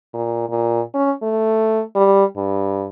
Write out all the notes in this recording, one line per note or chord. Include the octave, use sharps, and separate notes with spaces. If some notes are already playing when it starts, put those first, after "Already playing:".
A#2
A#2
C#4
A3
G3
G2